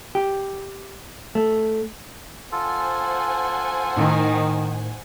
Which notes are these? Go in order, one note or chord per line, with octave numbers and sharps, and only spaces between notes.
G4
A3
F4 A4 C5 F#5 G#5
A2 D#3